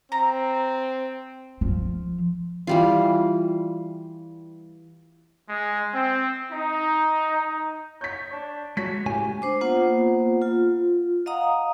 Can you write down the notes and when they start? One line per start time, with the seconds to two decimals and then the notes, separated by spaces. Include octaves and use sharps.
0.12 C4 A#5
1.61 F3
2.67 E3 G3 F4
5.48 G#3
5.93 C4
6.51 D#4
8.01 C#5 G6 B6
8.33 D4
8.77 G#3 F#4 C#5 B6
9.06 A2 C#3 G4 G#5
9.42 D4 C5 D6
9.61 A#3 B3 F4 C5 F#5
10.42 F4
11.26 D#5 F5 F#5 A#5 D#6